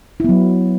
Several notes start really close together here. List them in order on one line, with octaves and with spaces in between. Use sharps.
E4 B3 F#3